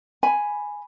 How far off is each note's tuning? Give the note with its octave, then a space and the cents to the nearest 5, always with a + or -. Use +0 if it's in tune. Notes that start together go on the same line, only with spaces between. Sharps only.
G#5 +0 B5 +0